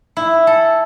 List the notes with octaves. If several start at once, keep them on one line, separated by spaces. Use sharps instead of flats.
E4
A4